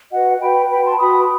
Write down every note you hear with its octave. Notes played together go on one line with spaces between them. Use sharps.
F#4 B4 D#5 F#5
F#4 B4 G5 B5
F#4 B4 G5 B5
A5 C6
F#4 B4 B5 D#6